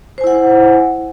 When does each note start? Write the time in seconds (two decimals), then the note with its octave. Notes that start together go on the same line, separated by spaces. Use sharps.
0.18 C5
0.21 G#5
0.24 E4
0.27 F#5